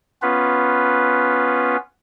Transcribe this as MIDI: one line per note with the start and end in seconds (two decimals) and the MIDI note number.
0.22 1.77 59
0.22 1.77 61
0.22 1.77 65
0.22 1.77 71